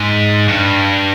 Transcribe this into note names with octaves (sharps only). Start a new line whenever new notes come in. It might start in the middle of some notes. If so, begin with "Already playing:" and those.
Already playing: G#2
G2